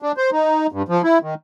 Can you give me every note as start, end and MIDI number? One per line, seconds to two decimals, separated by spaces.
0.02 0.12 62
0.17 0.30 72
0.32 0.67 63
0.72 0.82 43
0.88 1.02 53
1.04 1.19 64
1.22 1.34 51